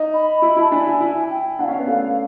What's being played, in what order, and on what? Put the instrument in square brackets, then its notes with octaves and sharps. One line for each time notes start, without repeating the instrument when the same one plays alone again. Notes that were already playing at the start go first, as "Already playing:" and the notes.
Already playing: [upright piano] D#4
[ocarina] B5
[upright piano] E4
[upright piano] E4 [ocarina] A5
[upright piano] D4 [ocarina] G#5
[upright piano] E4
E4
[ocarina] G5
[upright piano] D4 [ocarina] F#5
[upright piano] C#4 [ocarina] F5
[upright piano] B3
A3